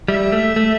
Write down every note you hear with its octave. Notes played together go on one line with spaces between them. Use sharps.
G3 E5
A3
A3